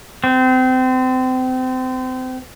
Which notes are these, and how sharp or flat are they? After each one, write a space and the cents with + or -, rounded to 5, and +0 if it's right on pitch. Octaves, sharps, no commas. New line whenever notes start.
C4 -30